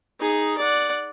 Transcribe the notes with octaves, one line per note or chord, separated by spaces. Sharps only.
D#4 G#4
D5 F#5